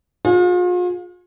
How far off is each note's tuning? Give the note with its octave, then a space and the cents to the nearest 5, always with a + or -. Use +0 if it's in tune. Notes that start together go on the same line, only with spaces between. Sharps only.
F4 +40 G#4 +0